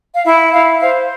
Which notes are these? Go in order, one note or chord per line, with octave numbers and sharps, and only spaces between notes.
F5
E4 E5
E4 F5
C5 F5